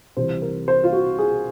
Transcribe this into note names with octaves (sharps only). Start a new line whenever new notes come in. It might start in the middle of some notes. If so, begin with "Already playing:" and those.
C2 C3 E3 G3 C4 C5
A#4
C5
F4
F#4
G#4